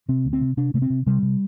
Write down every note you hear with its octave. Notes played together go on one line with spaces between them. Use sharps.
C3 C4
D2
C4
C3
C3 D4
C3 A3
C4
C3
C3 G3
C3